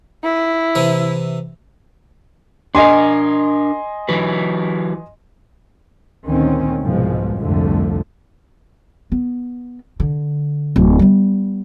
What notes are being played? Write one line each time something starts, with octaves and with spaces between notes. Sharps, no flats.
E4
C3 E3
D4 A#4 D#5 G#5 C6
E3 F#3 B4
D2 A#2 D#3 C4 C#4
C2 G#2 B2 F3 G#3
C2 F2 G#2 D3 F3 A3
B3
D3
D1 F#2
G3 B3